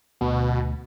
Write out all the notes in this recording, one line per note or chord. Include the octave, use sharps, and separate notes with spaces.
D2 B2